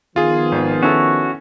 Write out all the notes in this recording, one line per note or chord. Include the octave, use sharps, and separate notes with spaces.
D#3 F3 B3 F4 G#4
G#1
C#4 E4 F#4 A4